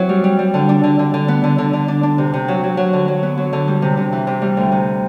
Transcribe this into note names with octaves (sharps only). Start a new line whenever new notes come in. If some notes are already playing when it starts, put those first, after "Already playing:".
Already playing: F#3 C4 E4
G3
G3
G3
D3
D4
D3
D3
D3
B3
D3
D3
D3
D4
D4
C3
C3
F#3
F#3
F#3
D3
F#3
B3
F#3
D3
G3
C3
C3
E3
C3
G3
D2
C3